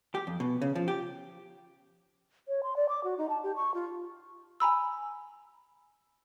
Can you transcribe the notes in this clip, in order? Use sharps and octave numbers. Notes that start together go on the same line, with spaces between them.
G4
F2
B2
C#3
F3
G4
C#5
C6
D5
D6
F#4
D#4
A5
G4
C#6
F4
G#5 A#5 B5 E6